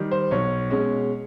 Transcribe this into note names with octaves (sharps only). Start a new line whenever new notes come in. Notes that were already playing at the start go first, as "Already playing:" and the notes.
Already playing: D#3 G3
C5
B1 C#5
B2 G#3 C#4